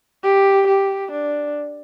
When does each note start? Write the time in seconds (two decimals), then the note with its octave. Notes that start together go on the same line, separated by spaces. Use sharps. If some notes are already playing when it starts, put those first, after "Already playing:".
0.23 G4
0.67 G4
1.12 D4